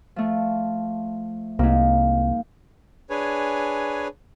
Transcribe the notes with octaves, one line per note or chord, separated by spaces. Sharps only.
F3 A3
C2 G#2 A#3
D4 G#4 B4 C#5 G#5